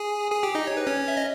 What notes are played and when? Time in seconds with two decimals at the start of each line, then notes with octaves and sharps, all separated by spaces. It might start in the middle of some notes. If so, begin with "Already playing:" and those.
Already playing: G#4 G#5
0.31 G#4 G#5
0.43 G4 G5
0.55 D#4 D#5
0.67 C#5
0.77 B4
0.87 C#4 C#5
1.08 E5
1.17 D#5